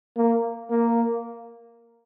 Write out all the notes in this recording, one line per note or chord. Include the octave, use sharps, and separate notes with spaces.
A#3
A#3